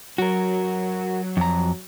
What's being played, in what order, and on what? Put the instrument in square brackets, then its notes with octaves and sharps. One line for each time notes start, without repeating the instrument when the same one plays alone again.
[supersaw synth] F#3 [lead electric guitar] F#4 A#4
[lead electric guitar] F2 A#5